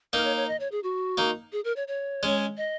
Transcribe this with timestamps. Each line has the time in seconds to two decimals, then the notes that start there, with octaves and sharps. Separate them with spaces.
0.13 A#3 D#4 A#4
0.25 C#5
0.36 C#5
0.48 D#5
0.60 C#5
0.72 G#4
0.83 F#4
1.17 A#3 D#4
1.53 G#4
1.65 A#4
1.76 C#5
1.88 C#5
2.23 G#3 C#4
2.57 D#5